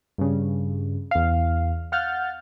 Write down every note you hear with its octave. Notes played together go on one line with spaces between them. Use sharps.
G2 C#3
E2 F5
F5 F#5 F6 G6 A6